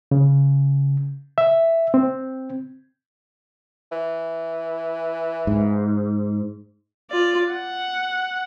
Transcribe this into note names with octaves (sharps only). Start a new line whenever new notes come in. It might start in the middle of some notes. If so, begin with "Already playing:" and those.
C#3
E5
C4
E3
G#2
F4 D5
F#5